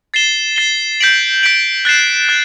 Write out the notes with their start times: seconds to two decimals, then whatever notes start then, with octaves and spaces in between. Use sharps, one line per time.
0.14 A6 C7 E7 G7
0.56 A6 C7 E7 G7
1.00 G6 B6 D7 F#7
1.43 G6 B6 D7 F#7
1.85 F#6 A6 C7 E7
2.29 F#6 A6